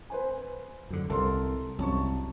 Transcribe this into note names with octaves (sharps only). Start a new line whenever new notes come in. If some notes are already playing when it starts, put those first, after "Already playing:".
B4 C5 G#5
F#2 D3
C2 A4 A#4 C6
C2 F#2 A5 C#6